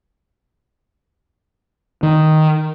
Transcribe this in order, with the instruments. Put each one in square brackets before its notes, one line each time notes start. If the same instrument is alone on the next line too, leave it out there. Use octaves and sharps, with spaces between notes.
[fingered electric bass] D#3